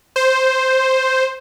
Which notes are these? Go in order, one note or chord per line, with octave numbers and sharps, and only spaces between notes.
C5